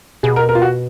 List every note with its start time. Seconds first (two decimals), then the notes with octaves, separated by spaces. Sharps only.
0.23 B2 G#4
0.36 A#4
0.49 A#4
0.55 F4
0.62 F#4